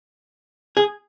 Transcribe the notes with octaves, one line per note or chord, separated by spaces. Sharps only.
G#4